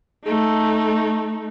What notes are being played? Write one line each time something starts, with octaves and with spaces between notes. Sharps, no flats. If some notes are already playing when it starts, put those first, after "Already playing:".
A3 D#4